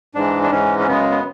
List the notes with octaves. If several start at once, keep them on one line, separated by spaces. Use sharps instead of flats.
G#2 E3 G#3 D4
D4
G#2 E3 G#3 C#4
C#4
F#2 C#3 G#3 B3
B3